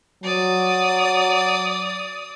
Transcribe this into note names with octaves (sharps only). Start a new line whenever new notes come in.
F#3 D5 D#6